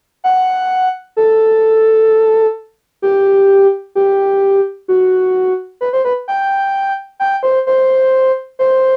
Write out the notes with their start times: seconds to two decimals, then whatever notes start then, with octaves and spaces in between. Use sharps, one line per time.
0.24 F#5
1.17 A4
3.02 G4
3.95 G4
4.88 F#4
5.81 B4
5.93 C5
6.05 B4
6.28 G5
7.20 G5
7.43 C5
7.67 C5
8.59 C5